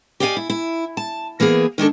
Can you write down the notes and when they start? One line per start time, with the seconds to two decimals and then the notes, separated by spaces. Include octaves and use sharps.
0.20 G4 D5 D#5 F5 F#5 G#5
0.37 E4
0.50 E4
0.97 A5
1.40 E3 A#3 B3 G#4
1.78 D#3 G#3 D4 A4